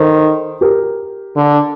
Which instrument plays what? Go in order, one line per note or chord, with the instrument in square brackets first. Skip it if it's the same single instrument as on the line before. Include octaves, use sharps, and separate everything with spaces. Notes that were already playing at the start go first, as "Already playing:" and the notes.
Already playing: [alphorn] D#3 [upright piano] A4 C5
[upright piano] G4 A#4
[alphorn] D3